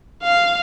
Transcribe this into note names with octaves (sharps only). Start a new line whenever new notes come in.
F5